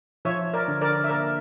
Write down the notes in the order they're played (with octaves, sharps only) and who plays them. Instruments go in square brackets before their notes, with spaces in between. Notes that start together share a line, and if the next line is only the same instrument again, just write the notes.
[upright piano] F3 [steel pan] C#5 E5
[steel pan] A#4 D5
[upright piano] D3
[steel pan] A#4 D5
E5
[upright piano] A#3 [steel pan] A#4 D5